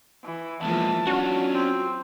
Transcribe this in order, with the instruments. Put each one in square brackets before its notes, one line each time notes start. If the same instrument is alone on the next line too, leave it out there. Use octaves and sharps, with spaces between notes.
[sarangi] E3
[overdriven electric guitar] E2 G#3 [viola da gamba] E3 F3 A#3 [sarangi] A5
[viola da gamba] F#3 F4 [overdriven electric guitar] C#4 D4 [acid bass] F#4
[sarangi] C4